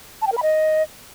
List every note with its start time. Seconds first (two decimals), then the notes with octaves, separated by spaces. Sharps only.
0.22 A5
0.27 G5
0.32 A#4
0.37 B5
0.43 D#5